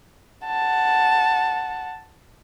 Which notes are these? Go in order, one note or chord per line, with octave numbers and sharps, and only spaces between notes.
F#5 A5